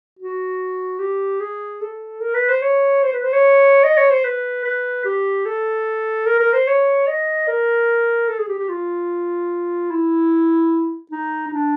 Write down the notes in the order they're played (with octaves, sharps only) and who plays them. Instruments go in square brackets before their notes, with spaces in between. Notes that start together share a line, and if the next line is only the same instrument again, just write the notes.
[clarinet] F#4
G4
G#4
A4
A#4
B4
C5
C#5
C5
B4
C5
C#5
D#5
C#5
C5
B4
B4
G4
A4
A#4
A#4
C5
C#5
D#5
A#4
A4
G#4
G4
G4
F4
E4
D#4
D#4
D4